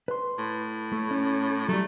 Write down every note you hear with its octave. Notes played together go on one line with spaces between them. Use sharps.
B4 C6
A2
A3
C#4
F#3 G3 A3